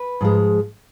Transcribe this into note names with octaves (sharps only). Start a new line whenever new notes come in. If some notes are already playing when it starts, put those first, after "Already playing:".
Already playing: B4
G#2 F3 G#3